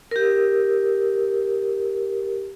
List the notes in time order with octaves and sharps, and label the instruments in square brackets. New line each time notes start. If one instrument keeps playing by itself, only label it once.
[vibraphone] G4 A#4